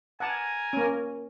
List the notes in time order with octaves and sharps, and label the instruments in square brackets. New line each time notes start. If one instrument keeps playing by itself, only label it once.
[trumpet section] A#4 G#5 [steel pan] F#5 A5
[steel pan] A#3 C#4